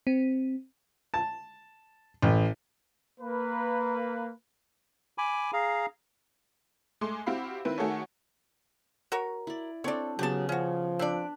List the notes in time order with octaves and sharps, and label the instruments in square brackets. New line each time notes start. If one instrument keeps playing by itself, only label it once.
[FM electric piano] C4
[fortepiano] A5
A1
[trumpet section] A#3 B4
[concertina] G#5 B5 D6
G#4 F5 A#5
[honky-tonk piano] G#3 A3 C6 D6
C4 E4 F#4 G4 F5 B5
D#3 C4 E4 B4
D#3 A3 F#4 G#4 A4 C#5
[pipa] F#4 A#4 C#5
[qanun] E4 D5
[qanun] C4 D4 A4 [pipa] C#5 D5
[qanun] C#3 B3 G#4 [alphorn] F#3 [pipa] G4 A5
[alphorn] F3 [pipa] C#4 F#4
[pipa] C4 D5 [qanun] D4 B4